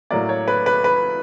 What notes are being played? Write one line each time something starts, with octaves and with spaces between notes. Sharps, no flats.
A2 F#3 A#3 D5
C#5
B4
B4
B4